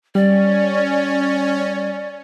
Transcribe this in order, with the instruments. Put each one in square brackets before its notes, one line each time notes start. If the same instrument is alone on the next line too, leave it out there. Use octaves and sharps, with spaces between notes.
[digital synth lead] G3 [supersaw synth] C#4 [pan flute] D5